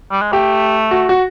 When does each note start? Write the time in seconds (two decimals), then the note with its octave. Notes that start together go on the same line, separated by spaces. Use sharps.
0.11 G3
0.22 G#3
0.33 A3 G4
0.91 F#4
1.09 F#4